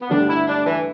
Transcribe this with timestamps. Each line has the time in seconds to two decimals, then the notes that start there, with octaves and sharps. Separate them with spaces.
0.01 B3
0.09 G2 D3 A3 D4 G4
0.28 E4
0.48 D4
0.66 E3